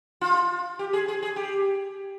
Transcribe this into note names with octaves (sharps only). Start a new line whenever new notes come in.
F4
G4
G#4
G#4
G#4
G4